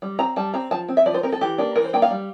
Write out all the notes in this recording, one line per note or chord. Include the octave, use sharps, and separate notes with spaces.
G3
C4 A#5
G3 A5
C4 A#5
F3 A5
C4
E5
F3 D5
C5
C4 A#4
A4
E3 G4
A#3 D4
E3 A#4
C5
A#3 D4 G5
F5
G3